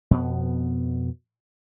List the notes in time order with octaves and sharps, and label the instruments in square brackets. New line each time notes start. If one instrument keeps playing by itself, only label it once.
[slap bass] F2 B2 B3